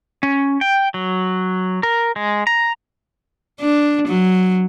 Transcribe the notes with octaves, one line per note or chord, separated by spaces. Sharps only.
C#4
G5
F#3
A#4
G#3
A#5
D4
F#3